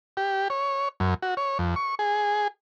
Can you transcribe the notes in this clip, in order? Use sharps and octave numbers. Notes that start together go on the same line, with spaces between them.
G4
C#5
F#2
F#4
C#5
F2
C#6
G#4